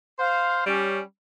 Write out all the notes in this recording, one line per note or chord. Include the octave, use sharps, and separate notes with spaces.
C5 F5
G3 C#4